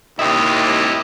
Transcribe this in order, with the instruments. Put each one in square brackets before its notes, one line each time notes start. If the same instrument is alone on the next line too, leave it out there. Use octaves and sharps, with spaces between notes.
[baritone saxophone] D#2 [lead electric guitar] E4 G4 [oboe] D#5